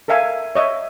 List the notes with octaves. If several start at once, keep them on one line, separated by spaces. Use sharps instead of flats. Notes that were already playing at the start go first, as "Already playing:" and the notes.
A4 A#4 E5 F5 G#5
C#5 D#5 E5